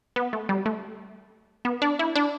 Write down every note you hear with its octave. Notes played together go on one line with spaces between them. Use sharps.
B3
A3
G3
A3
B3
D4
E4
D4